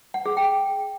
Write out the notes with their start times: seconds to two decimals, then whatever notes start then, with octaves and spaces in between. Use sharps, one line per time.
0.14 F#5
0.26 G#4
0.37 G5